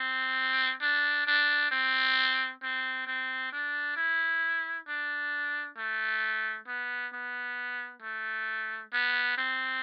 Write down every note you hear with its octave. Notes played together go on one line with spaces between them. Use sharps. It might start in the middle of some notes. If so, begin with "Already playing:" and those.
Already playing: C4
D4
D4
C4
C4
C4
D4
E4
D4
A3
B3
B3
A3
B3
C4